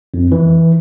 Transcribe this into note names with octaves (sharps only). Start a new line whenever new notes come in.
F2
E3